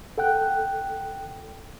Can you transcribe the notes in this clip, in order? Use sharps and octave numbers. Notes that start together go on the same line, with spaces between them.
A4 F#5 G5 F#6